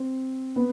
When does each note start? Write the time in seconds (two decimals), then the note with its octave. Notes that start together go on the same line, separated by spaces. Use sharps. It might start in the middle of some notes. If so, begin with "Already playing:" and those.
Already playing: C4
0.56 B3